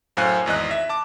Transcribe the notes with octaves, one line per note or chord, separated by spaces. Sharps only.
F#2 A2 C5 F5 G#5 F#6
G#1 E2 D#5 F#6
E5
A5 D6